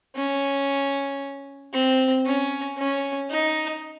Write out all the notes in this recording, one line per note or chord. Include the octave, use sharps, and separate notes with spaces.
C#4
C4
C#4
C#4
D#4